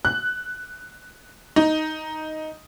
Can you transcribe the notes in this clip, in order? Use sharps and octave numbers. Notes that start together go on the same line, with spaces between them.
F#6
D#4